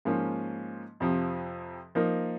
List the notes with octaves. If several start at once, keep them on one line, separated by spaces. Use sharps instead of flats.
G#2 F3 A#3 C#4
F2 C3 F3
F3 A#3 D#4 A#4